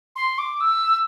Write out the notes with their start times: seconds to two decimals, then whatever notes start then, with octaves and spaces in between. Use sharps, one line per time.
0.16 C6
0.38 D6
0.61 E6